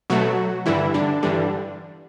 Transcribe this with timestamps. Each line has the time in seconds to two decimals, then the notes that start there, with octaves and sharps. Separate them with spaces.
0.10 B2 F#3 A3 F#4
0.66 G2 D3 E3 G3 E4
0.94 D3 D4
1.23 G2 D3 E3 G3 D4